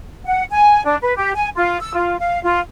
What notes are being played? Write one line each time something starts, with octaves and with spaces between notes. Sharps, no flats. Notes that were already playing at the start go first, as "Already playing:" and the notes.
F#5
G#5
D4
B4
G4
G#5
F4
E6
F4
F5
F4